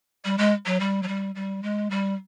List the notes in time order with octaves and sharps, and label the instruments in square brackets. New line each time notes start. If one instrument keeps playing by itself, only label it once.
[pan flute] G3
G#3
F#3
G3
F#3
G3
G3
G#3
G3